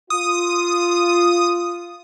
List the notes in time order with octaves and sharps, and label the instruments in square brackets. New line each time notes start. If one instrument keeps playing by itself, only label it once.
[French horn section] F4 [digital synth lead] D#6